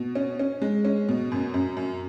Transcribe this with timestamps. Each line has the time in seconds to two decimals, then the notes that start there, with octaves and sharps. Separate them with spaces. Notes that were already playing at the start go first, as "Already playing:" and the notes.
Already playing: B2
0.15 C#4
0.39 C#4
0.62 G#3
0.85 C#4
1.09 B2
1.32 F#2
1.54 F#2
1.77 F#2